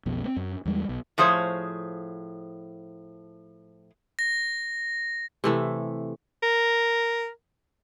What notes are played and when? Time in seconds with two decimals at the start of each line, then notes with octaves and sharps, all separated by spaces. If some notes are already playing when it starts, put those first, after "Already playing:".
0.06 B1 F2 B2
0.24 A3 C4
0.36 F#2
0.65 E2 G3 G#3
0.89 B1
1.18 A2 F3 G#4 C5 C#5
4.19 A#6
5.44 C3 E3 A3
6.43 A#4